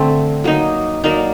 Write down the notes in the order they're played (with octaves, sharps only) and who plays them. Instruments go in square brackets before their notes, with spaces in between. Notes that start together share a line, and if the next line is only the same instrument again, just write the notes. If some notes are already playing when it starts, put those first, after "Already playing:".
Already playing: [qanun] D3 A3 C4
F#3 A#3 D#4
F#3 A#3 D#4 A#4 D5